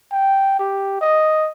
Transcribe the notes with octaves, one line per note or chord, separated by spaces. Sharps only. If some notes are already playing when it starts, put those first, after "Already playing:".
G5
G4
D#5